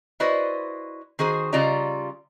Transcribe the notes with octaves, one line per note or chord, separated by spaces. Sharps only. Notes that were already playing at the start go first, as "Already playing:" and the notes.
E4 F#4 B4 C5 D5 D#5
D#3 F#4 G#4 C5
C#3 G3 F4 D5 D#5 A#5